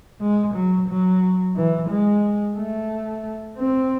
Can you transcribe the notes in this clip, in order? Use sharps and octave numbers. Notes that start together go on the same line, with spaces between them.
G#3
F#3
F#3
E3
G#3
A3
C4